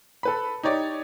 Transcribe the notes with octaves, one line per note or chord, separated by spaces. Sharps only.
A4 B4 B5
D#4 G4 C#5 D5